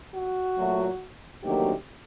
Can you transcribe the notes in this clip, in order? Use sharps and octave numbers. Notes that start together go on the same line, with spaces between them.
F#4
A#2 F#3 A3
D2 C3 D#3 F#3 A#3 G4